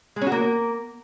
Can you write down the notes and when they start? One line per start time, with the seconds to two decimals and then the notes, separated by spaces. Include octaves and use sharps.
0.16 G#3
0.21 C#4
0.27 F#4
0.32 A#3